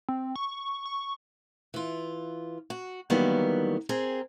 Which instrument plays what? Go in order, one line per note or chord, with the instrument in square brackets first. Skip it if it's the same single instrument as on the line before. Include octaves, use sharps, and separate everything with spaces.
[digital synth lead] C4
C#6
C#6
[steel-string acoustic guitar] E3 F4
F#4
D#3 E3 F#3 G3 A#3 B3
C4 G#4 A#4